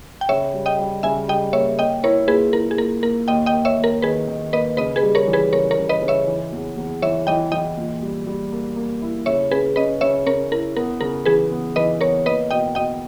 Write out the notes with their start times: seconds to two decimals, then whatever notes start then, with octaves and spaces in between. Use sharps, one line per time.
0.21 G5
0.29 C#3 C#5 E5
0.54 G3
0.66 D#5 G5
0.79 G3
1.03 C#3 E5 G#5
1.28 G3 D#5 G5
1.53 A#3 C#5 E5
1.79 A#3 D#5 G5
2.03 E4 A#4 C#5
2.28 A#2 G#4 B4
2.53 E4 A#4
2.71 G#4
2.78 A#2 A#4
3.03 A#3 A#4
3.28 D#2 D#5 G5
3.46 D#5 G5
3.53 A#3
3.65 C#5 E5
3.78 D#2
3.84 A#4
4.02 D#3 G#4 B4
4.28 D#3
4.53 A#3 B4 D#5
4.77 C#3 B4 D#5
4.96 G#4 B4
5.03 G3
5.15 A#4 C#5
5.27 E3
5.33 G#4 B4
5.53 C#3 A#4 C#5
5.71 A#4 C#5
5.78 C#3
5.89 B4 D#5
6.02 C#3
6.08 C#5 E5
6.27 E3
6.52 E2
6.77 E2
7.02 E3 C#5 E5
7.27 E3 D#5 G5
7.52 E3 D#5 G5
7.77 A#2
8.02 G3
8.27 G3
8.52 A#3
8.76 A#3
9.02 E4
9.26 C#3 C#5 E5
9.51 C#4 G#4 B4
9.76 C#4 B4 D#5
10.01 C#3 C#5 E5
10.26 C#4 A#4 C#5
10.52 E4 A#4
10.76 B3 A#4
11.01 C#3 A#4
11.25 E3 G#4 B4
11.51 B3
11.76 E3 B4 D#5
12.01 B3 A#4 C#5
12.26 A#3 B4 D#5
12.51 B2 D#5 G5
12.75 B2 D#5 G5